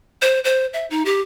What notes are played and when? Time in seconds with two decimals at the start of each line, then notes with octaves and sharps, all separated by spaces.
0.22 C5
0.44 C5
0.73 E5
0.90 D#4
1.05 G4